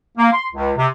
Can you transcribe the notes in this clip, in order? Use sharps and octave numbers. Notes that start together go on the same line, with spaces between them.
A#3
C6
C#2
C3